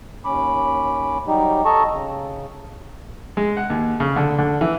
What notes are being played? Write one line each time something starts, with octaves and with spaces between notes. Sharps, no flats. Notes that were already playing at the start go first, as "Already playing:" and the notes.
D#2 C#4 B5 D6
F#3 G3 D#4 G4
A4 D#5 A5 A#5 C#6
C#3
G#3
F#5
D#2
C#3
D3
D3
E3